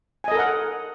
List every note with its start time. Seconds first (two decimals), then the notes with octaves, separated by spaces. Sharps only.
0.24 G#5
0.28 D#5
0.32 A4
0.35 A#4
0.39 F#5